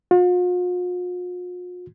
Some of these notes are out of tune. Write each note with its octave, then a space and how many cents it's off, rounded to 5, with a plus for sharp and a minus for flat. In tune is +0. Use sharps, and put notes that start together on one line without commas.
F4 +45